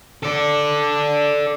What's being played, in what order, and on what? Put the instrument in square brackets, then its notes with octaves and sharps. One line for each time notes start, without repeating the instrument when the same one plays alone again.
[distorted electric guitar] A4 D5